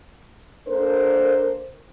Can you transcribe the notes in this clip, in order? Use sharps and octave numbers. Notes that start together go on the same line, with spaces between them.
A#3 D4 A4 A#4 C5